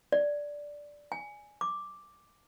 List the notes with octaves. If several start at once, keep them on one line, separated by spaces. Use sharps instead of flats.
D5
G#5
D6